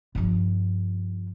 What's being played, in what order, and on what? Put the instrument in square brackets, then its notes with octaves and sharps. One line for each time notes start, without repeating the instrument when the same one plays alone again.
[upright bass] G2 F3